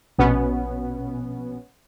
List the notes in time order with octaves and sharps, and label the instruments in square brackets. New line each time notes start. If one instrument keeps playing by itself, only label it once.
[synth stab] A#1 B2 B3 C#4